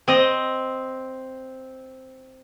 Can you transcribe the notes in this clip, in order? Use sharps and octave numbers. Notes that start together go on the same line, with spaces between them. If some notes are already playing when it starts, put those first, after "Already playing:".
C4 D#5